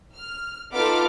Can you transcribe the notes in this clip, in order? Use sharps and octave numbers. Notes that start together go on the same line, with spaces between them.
F6
B3 D#4 F4 A4 D6 F6